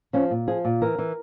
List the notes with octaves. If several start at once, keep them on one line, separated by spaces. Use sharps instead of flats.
F3 C#4
A#2
F3 G#4
A#2
E3 A#4
E3